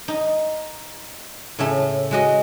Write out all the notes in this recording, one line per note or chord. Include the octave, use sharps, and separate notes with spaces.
D#4
A2 C#3 A3
G#3 F#4 D#5